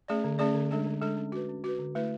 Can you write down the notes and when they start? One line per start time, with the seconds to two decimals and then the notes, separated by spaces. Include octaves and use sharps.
0.08 A3 C#4 G#4 D5
0.24 D3
0.39 A3 C#4 G#4 D5
0.54 D3
0.71 G#3 D4 A4
0.87 D3
1.01 G#3 D4 A4
1.17 C#4
1.32 F#4 B4
1.49 C#4
1.64 F#4 B4
1.79 D3
1.95 A3 E4 B4